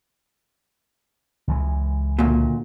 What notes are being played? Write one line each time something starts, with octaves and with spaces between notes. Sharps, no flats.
C#2 E3 G#3
D2 A#2